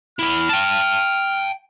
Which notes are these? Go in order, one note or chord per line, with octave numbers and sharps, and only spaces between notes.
B3 E4 F6
G5 A5